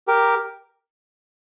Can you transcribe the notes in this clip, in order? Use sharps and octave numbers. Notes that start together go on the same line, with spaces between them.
G4 A#4